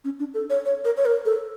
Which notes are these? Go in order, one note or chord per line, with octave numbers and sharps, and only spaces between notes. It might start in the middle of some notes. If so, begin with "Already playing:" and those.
C#4
D4
A4
C#5
C#5
A#4
C#5
A#4
A4